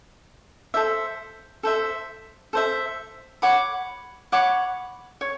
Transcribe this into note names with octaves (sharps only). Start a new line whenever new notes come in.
A4 C5 E5
A4 C5 E5
A4 C5 E5
C#5 F#5 B5 D6
C#5 F#5 B5 D6
C#5